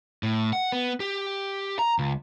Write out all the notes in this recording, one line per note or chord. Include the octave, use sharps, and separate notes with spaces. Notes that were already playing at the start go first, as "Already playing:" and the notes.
A2
F#5
B3
G4
A#5
C#2